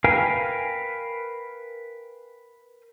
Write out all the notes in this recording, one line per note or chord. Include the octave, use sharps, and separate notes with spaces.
A#4 B4 F5 G5 G#5